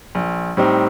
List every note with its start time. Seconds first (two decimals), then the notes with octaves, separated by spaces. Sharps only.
0.15 A#1
0.57 A2 G3 C4 D#4